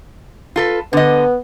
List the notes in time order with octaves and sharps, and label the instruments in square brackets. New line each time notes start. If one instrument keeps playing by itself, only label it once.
[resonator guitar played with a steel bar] F4 A4 B4
[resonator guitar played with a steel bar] D3 D#5 [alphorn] B3